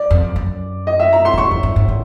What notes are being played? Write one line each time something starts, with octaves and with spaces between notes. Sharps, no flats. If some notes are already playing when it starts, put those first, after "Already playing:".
Already playing: D5
F2
F#2
D#5
E5
A#5
C6
A2
G#2 C#6
F2
G2
G#2
A2